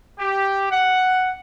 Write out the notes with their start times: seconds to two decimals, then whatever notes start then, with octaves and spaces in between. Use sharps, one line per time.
0.19 G4
0.72 F#5